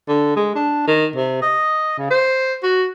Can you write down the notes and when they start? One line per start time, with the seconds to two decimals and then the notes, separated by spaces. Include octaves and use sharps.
0.08 D3
0.36 G#3
0.55 D4
0.87 D#3
1.16 C3
1.42 D#5
1.98 C#3
2.10 C5
2.63 F#4